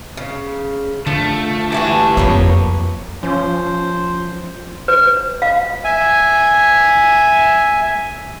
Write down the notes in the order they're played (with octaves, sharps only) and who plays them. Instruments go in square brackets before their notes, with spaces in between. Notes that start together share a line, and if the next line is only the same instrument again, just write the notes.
[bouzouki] C#3
[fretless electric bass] D3 [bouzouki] F3 [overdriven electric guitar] A3
[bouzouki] E3 A3 F#4 [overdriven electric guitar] G4 A5
[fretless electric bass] F#1 [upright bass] F2 [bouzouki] A#3 B3 C#5
[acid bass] F3 [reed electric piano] C#4 [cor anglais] C5
[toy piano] B4
F5
[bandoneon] E5 G#5